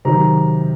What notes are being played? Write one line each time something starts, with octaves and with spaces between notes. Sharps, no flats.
C3 D#3 F#3 A#5